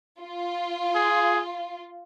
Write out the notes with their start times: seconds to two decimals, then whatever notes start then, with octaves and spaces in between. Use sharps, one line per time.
0.21 F4
0.96 G#4